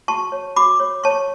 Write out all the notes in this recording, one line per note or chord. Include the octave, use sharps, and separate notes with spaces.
F#4 A5 C#6
C#5
F#4 B5 D6
C#5
C#5 A5 C#6